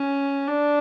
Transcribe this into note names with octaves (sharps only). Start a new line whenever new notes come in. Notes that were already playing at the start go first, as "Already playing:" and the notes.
Already playing: C#4
D4